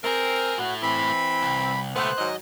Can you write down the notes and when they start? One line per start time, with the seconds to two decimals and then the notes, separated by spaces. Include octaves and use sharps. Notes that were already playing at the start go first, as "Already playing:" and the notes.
0.04 A3 C4 G#4 A#4
0.58 A2 A3 F#4
0.82 E3 C4 B5
1.43 C2
1.96 C#2 B2 A3 B3 C5 F#6
2.18 G#2 D#3 F#3 D#5